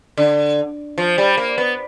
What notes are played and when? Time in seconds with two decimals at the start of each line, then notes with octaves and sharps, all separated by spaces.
0.17 D3
0.98 F3
1.18 G3
1.37 A#3
1.58 B3